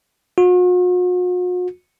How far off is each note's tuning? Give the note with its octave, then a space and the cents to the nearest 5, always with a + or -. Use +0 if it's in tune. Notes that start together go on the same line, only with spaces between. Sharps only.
F#4 -45